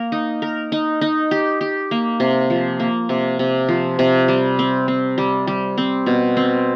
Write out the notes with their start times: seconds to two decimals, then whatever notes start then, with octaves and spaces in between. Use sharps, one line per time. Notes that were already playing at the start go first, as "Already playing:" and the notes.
Already playing: A#3 A#4
0.12 D#4
0.42 A#4
0.72 D#4
1.01 D#4
1.31 G4
1.61 G4
1.91 A#3
2.20 C3
2.50 F3
2.80 A#3
3.09 C3
3.39 C3
3.69 F3
3.99 C3
4.28 G3
4.59 C4
4.88 C4
5.18 G3
5.47 G3
5.78 C4
6.06 B2
6.37 C4